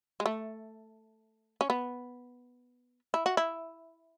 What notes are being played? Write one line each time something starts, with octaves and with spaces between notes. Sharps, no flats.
G#3
A3
C#4
B3
E4
F#4
E4